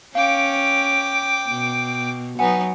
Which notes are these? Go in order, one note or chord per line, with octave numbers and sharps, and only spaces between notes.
C#4 F5 G5 D6
B2
F#3 B3 D#4 F#5 G#5